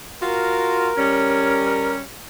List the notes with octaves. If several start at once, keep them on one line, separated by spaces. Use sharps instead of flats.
F4 F#4 A#4
G3 C#4